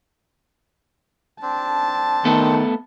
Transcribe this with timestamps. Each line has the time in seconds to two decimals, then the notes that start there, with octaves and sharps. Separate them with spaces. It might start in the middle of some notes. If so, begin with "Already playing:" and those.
1.42 C4 D4 A5
2.25 D#3 A3 B3 A4